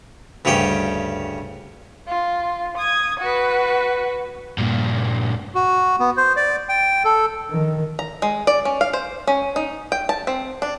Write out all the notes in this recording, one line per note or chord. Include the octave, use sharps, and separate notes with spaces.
D2 G2 C#3 C#4 G4 G5
F4
D#6 G#6
F#4 B4
G2 A#2
F#4
B3
C5
D5
G5
A4
D#3
A#5
G#3
D5
C#4
F5
C5
C#4
D#4
G5
A5
C4
D4